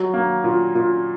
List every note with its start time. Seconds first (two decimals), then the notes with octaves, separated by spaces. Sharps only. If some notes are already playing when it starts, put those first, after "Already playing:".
Already playing: F#3
0.14 A#3
0.44 A#2
0.75 A#2